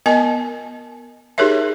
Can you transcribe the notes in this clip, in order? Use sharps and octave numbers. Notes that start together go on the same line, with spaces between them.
B3 A#4 D#5 G#5
D#4 G4 G#4 A#4 C#5 E5